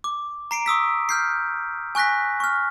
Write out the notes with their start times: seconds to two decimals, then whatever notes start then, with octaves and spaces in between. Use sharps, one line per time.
0.04 D6
0.51 A#5 C7 D7
0.66 C#6 D#6 E6 B6
1.09 F6 G6 C7
1.95 G#5 C#6 F#6 A#6 B6
2.40 C#6 F6